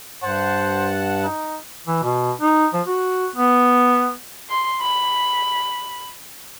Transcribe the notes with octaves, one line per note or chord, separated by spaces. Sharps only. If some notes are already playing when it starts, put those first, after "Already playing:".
G2 C5 F#5 A5
D#4
E3
B2
D#4
F3
F#4
B3
C6
B5